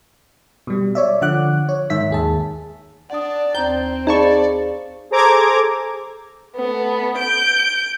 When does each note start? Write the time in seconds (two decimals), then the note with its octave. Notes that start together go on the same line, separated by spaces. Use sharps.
0.67 B2 G3
0.95 C#5 D5 E5
1.22 D3 F3 F#5 D6 F#6
1.69 C#5
1.90 G#2 D#3 E5 B6
2.10 D#2 G#4 A5
3.10 D4 D5 F#5 D#6
3.55 D#2 C4 A#5 G6
4.07 D#4 G#4 D5 F5 A5 B5 C#6
5.11 G#4 A4 C5 A#5 D6 G#6
6.56 A3 B3
7.17 G6 D7